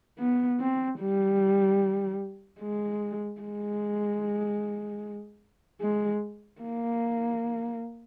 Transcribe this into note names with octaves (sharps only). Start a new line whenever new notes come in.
B3
C4
G3
G#3
G#3
G#3
A#3